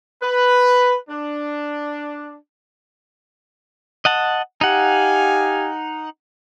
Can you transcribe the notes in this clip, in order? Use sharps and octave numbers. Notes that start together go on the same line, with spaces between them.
B4
D4
D#5 F#5 A5
D#4 G4 F5 F#5 G#5